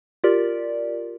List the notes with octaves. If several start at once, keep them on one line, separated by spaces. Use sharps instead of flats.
F4 G4 A#4 D5